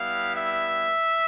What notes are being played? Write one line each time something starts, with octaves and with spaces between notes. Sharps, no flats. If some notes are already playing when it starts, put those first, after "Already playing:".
Already playing: G3 B3 E4 F5
E5